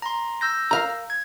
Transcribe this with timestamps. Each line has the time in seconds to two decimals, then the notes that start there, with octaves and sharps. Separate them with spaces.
0.02 A#5 C6
0.41 E6 G6 A#6
0.71 A#4 F5 A#5
1.10 G#6